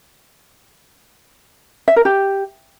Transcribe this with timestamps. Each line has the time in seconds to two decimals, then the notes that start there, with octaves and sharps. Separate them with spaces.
1.88 E5
1.96 A#4
2.05 G4